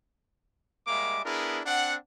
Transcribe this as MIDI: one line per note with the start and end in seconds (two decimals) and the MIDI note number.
0.87 1.20 55
0.87 1.20 56
0.87 1.20 58
0.87 1.20 76
0.87 1.20 86
1.24 1.60 59
1.24 1.60 62
1.24 1.60 64
1.24 1.60 68
1.24 1.60 70
1.66 1.96 60
1.66 1.96 62
1.66 1.96 78